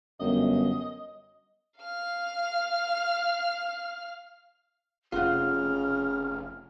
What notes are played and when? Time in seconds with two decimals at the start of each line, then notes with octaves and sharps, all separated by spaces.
0.20 G1 F#2 D#5
1.80 F5 F6
5.12 F1 C#3 F4 F#5 F6